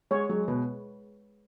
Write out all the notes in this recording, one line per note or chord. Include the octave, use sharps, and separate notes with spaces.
G#3 C#5
F#3 G#3
B2 B4